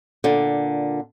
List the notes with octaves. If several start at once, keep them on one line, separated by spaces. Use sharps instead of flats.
A#2 D3